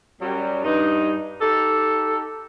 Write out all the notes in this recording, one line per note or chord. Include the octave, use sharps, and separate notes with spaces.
F#2 F#3 G3
G2 D#4
D#4 G4 A4